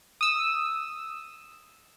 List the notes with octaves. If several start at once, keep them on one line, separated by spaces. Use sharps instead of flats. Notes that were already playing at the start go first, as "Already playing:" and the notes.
D#6 E6